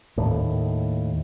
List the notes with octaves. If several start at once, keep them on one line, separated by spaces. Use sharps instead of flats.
D#2 A2